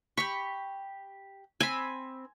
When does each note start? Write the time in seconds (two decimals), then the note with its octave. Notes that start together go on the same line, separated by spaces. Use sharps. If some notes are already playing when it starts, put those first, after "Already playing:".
0.17 G4 B5 C#6
1.60 C4 G#5 B5